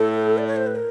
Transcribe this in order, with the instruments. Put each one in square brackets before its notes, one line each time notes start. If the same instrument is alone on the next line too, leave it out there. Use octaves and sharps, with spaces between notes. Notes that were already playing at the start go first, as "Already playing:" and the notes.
Already playing: [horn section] A2 [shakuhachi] A4
[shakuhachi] D5
C#5
C5
B4
A#4